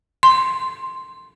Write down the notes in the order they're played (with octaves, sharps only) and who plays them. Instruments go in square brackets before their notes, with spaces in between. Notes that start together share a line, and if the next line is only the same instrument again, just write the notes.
[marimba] C6